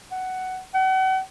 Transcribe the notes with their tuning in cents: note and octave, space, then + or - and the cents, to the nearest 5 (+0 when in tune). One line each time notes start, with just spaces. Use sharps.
F#5 +10
F#5 +40